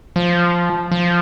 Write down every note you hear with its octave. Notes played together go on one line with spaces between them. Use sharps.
F3
F3